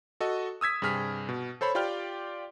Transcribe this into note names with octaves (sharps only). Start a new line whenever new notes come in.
F#4 A4 D#5
D#6 E6 G#6 B6
G2 C3 G#4 F6 B6
B2
A4 C5 C#5 B5
F4 G4 D5 G5 F6